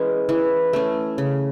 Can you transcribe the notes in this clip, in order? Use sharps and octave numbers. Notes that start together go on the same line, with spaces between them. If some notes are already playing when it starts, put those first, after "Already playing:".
Already playing: E3 G#3 C#4
E3
A3 C#4
C#3